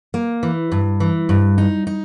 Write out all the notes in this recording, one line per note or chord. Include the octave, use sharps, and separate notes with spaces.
A#3
E3
G2
E3
G2
D#4
D#4